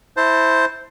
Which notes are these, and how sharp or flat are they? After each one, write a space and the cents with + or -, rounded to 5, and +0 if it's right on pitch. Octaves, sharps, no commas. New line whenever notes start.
E4 -10 C5 +0 A5 +20